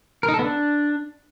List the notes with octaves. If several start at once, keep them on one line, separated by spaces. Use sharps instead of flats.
A#4
D#4
A4
B3
D4